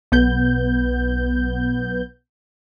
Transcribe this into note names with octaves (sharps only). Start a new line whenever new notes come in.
B1 B3 G6